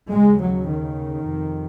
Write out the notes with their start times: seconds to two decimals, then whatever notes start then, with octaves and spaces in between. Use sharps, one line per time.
0.08 D#2 C#3 G#3
0.38 F#3
0.67 D#3
1.25 F2 C3